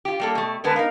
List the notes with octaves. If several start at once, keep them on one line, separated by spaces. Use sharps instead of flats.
F4 G4
G3 A#3 A4
B2 A3
D3 G#3 B3 A#4 B4 A5
B3 D#4 A#4 F5